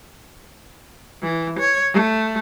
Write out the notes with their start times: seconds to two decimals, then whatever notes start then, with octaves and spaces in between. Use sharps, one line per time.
1.22 E3
1.59 C#5
1.93 A3